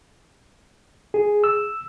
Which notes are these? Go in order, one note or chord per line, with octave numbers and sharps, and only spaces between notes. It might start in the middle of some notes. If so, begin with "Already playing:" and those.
G#4
E6